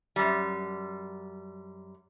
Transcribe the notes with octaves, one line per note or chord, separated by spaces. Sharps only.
F#2 G3